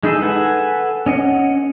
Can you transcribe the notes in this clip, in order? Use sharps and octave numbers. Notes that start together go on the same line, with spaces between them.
G#3 D#4 E4 G#4 A4
A4 B4 F#5 G#5
C#4 D#5 F#5